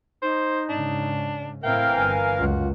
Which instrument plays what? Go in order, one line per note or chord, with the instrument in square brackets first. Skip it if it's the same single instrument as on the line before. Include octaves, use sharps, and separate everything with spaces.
[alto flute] D#4 [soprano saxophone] C5
[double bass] G#2 C#3 [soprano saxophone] D4
[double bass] A2 C4 [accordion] E3 A#4 F5 [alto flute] E5 [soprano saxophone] G5
[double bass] G1 [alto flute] G#5
[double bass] C#2 F#2 [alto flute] F4 [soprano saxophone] F#4